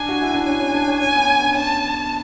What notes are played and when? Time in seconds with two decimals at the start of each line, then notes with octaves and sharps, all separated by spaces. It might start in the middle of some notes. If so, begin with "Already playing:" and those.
Already playing: D4 G#5
0.09 F#4
0.22 E4
0.34 D4
0.46 C#4 G#5
0.60 C#4
0.74 D4
0.88 C#4
1.00 C#4 G#5
1.15 B3
1.28 C#4
1.41 D4
1.55 C#4 A5